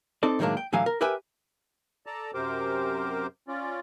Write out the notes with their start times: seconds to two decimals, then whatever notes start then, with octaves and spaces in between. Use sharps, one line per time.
0.23 C4 D#4 A4 D5
0.39 A2 D#3 F#3 G#3 A#3 D4
0.57 G5
0.73 A2 D3 E3 F#3 F5 G#5
0.86 A#4
1.01 G4 A#4 B4 E5 G5 G#5
2.06 A4 D5 A5 A#5
2.34 F#2 C3 G4 A#4 C5 D6
3.48 C#4 F4 D5